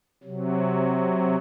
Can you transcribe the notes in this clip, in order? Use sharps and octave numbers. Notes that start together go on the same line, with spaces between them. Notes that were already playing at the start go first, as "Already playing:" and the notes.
C3 F#3